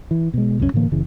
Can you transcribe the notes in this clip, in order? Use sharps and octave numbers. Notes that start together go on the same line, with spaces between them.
E3
B2 G#3
C2 F#2 E3 C#4
A2 D3 E3 A#3
F#1 C#3 E3